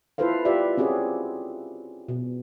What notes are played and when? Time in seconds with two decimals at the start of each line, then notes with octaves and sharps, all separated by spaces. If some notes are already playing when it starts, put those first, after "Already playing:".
0.18 E4 F4 A4 B4 C5 F5
0.45 F4 G4 B4 D5 E5
0.78 C4 C#4 F#4 G#4 D5
2.08 B2